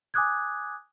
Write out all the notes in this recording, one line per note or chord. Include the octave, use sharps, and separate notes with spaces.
G#5 D6 D#6 F#6 G#6